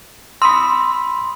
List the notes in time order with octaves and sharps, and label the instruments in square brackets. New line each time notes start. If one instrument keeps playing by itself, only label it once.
[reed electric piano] B5 D#6 E6 [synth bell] C6